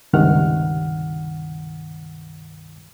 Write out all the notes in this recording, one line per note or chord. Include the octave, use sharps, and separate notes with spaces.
C#2 G2 C3 D#3 F#5 F6